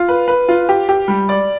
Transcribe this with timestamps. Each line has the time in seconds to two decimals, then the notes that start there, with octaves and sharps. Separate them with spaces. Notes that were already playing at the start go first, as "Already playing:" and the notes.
Already playing: F4
0.09 B4
0.28 B4
0.49 F4
0.69 G4
0.89 G4
1.08 G3
1.29 D5